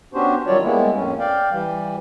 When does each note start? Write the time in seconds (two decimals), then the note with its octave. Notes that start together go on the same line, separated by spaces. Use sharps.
0.14 B3 C#4 D4 F#4 G4 C5
0.47 D#3 F#3 G3 F4 C#5 D5
0.63 G3 G#3 A#3 B3 E4
0.94 F2 A2 C#4
1.19 D5 F5 G5
1.51 E3 G3